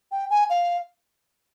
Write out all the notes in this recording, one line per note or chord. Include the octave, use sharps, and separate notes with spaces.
G5
G#5
F5